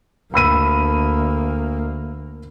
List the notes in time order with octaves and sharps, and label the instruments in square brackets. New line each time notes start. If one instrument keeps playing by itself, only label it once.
[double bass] D2 A#3 [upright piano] B5 E6 D#7